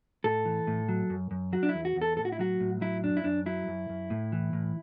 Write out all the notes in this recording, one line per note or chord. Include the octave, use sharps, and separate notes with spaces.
A2 A4
E3
A2
F#3
F#2
F#2
F#3 F#4
D4
E4
E2
F#4
E2
A4
A2 A4
F#4
E4
F#3 F#4
A2
F#3 E4
F#2 D4
E4
F#2 D4
F#3 E4
F#2
F#2
A2
E3
A2